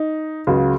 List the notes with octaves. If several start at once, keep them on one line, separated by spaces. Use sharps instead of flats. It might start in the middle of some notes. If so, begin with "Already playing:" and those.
Already playing: D#4
C#2 C#3 F#3